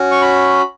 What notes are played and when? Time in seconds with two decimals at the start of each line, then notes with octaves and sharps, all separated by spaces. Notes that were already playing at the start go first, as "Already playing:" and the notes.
Already playing: C#4 F#4
0.11 C#6
0.21 B5